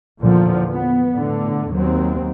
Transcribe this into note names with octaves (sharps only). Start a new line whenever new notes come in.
E2 A#2 D3 F3
B3
A2 D3
D#2 F#3 C4